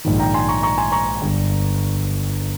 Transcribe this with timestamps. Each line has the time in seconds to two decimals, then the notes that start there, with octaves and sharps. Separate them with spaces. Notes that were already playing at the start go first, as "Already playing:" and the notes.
0.05 A#1 G#2 D#3
0.19 G5 A#5
0.34 G#5 C6
0.49 A#5 C#6
0.63 A#5 C#6
0.78 G#5 C6
0.92 A#5 C#6
1.21 G1 G2 G3